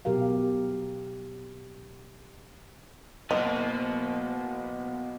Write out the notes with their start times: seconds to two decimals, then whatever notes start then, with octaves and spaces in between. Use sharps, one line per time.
0.05 B2 F#3 G4 A#4 F5
3.31 F#1 B2 A#3 B3 D#5